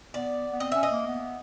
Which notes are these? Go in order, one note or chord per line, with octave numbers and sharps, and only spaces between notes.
B3 D5
B3
C4 D#5
C#4 E5
D#5
A#3
B3